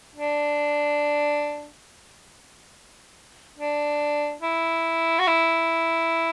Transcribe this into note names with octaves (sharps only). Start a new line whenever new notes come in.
D4
D4
E4
F#4
E4